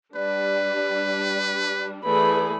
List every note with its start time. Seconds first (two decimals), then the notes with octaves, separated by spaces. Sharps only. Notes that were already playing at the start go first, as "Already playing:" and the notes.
0.15 G3 D4 B4 D5
2.04 E3 A3 G#4 B4 D5 B5